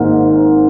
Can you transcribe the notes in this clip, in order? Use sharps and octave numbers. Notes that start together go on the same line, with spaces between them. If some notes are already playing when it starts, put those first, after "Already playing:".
Already playing: G#1 G#2 A#3